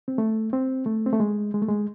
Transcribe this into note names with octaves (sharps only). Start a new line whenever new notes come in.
C4
A3
C4
A3
C4
A3
G#3
G#3
A3
G#3